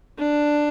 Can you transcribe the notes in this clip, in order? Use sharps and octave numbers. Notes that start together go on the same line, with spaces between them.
D4